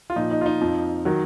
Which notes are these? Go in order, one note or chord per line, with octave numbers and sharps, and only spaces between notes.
F4
A#2 F3 D#4
D#4
F4
D#4
F2 F3
D#3 F#3